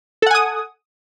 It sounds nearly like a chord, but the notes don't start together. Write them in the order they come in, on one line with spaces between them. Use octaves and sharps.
A4 F#5 G#5 D#6